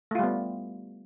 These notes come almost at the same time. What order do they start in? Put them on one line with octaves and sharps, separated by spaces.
A3 F4 G3 B3